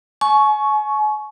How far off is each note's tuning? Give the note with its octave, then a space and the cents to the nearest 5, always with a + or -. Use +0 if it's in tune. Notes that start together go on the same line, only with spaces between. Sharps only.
G#5 +40 C#6 +0